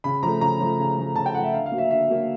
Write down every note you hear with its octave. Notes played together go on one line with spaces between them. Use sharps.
C#3 B5
F3 A3 A#5
C#3 A#5
F3 A3
C#3
F3 A3
C#3 A5
G5
F3 A3 F#5
E5
D3 F5
F5
F#3 A#3
E5
D3 E5
F#3 A#3